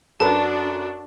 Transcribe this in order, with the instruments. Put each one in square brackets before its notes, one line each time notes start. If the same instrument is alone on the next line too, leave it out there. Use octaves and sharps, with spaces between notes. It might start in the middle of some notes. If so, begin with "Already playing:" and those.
[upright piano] F#2 A4 B4 [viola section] D4 F#4 [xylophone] A5